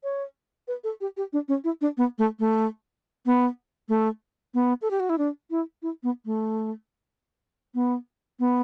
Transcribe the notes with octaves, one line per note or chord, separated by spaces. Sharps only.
C#5
B4
A4
G4
G4
D4
C#4
E4
D4
B3
A3
A3
B3
A3
B3
A4
G4
F#4
E4
D4
E4
E4
B3
A3
B3
B3